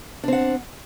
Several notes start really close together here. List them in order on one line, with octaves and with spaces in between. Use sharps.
D4 C4 F#5